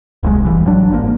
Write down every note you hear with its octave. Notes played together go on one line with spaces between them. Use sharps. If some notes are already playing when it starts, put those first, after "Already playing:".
D1 C2 B2 G#3
F1 E3 G3
A1 F#3 D4
G#1 G#2 C#3 A#3